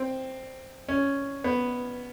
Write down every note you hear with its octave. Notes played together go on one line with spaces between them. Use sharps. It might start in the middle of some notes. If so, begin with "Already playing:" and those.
Already playing: C4
C#4
B3